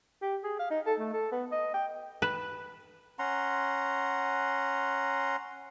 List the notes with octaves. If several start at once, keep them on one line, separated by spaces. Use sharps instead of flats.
G4
G#4
F5
D#4
A4
A3
A4
B3
D#5
G5
B4
C#4 F#5 A#5 C6